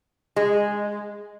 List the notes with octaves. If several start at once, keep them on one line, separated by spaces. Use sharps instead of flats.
G#3